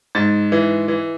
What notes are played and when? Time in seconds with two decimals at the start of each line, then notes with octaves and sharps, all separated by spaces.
0.15 G#2 A6
0.52 E3
0.88 E3